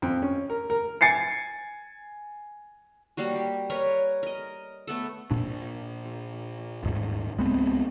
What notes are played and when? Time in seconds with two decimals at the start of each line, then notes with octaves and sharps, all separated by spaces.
0.02 F2
0.22 C#4
0.50 A#4
0.70 A#4
1.01 G#5 A6 C7 C#7
3.17 G3 A#3 F#4
3.35 G4
3.70 A#4 B4 C#5
4.23 A#4 D#5
4.87 A3 B3 A4
5.31 A#2 D4
6.84 D#1 G#2
7.38 C#2 G#3 B3 C4